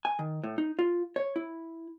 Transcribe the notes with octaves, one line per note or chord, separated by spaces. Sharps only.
G#5
D#3
A2
D#4
F4
C#5
E4